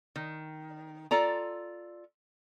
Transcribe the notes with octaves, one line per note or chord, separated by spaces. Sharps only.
D#3
F4 A4 D5 A#5